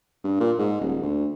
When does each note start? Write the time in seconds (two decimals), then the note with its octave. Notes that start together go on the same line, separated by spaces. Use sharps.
0.24 G2
0.40 A#2
0.59 G#2
0.81 D#1
1.02 D2